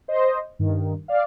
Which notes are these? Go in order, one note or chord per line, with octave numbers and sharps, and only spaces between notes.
C5 D#5
G2 D#3
D5 F5